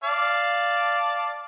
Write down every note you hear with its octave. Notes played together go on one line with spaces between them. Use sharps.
D5 F5 A5